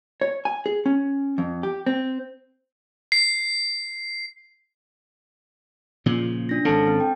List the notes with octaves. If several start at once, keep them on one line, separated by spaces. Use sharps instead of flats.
C#5
G#5
G#4
C#4
F2
G4
C4
C7
A#2 C#3 F3
D4 A#6
G#1 C#3 C4 A4 A5
C4
G5